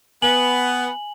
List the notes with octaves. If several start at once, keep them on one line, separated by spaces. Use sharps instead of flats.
B3 G#5 F#7